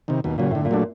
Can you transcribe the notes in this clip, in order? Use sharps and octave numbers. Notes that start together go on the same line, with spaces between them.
C3 D#3
D#2 B2
A#2 C#3 F#3
A2 D3
A#2
F#3 A3 D4